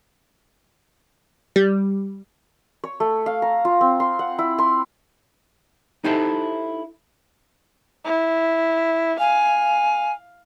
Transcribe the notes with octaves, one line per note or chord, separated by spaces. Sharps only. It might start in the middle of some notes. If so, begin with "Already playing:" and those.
G3
C#5
A3
F5
A#5
F4
C4
C6
F#5
E4
C6
D#4 E4 G4 A4 C5 E5
E4
F5 G#5